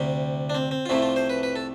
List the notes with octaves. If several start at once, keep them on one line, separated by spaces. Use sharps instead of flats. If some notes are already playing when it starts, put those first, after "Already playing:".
Already playing: D2 C3 G3
D4
C4
C4
F4
C2 C3 F3 A3 E4
F4
C5
B4
B4
A4